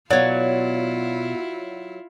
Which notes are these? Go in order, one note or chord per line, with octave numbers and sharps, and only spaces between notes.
B2 F#3 E4 F4 C#5 D5 F5